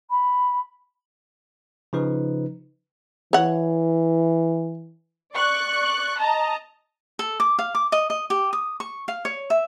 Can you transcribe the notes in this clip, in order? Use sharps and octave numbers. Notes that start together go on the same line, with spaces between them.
B5
C#3 F3 D#4 B4
E3 C#5 F#5
D5 C#6 F#6
D#5 A5 A#5
A4
D6
F5
D6
D#5
D#5
G4
D#6
C#6
F5
C#5
E5